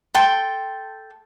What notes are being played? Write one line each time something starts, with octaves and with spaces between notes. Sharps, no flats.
A4 G5 C6